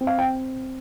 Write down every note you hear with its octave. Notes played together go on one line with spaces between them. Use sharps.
C4
F5
G5